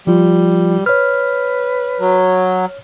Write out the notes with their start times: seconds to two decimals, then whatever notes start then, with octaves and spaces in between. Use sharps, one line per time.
0.07 F3 G3 F4
0.86 B4 C#5 F6
2.00 F#3